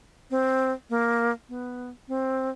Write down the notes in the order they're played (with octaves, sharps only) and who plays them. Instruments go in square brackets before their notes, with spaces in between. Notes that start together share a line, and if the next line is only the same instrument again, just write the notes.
[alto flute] C4
A#3
B3
C4